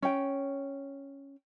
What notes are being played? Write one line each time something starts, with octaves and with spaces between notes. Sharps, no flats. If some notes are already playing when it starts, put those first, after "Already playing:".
C#4 G5